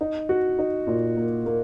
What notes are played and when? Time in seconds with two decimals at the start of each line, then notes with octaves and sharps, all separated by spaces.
0.01 D#4
0.29 F#4
0.59 D#4
0.87 A#2
1.17 A#3
1.46 A#3